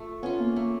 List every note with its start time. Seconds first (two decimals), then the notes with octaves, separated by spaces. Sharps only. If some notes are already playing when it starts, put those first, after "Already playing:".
Already playing: A3 F4
0.22 B3 C#4 F4
0.40 A#3
0.56 A3 A#3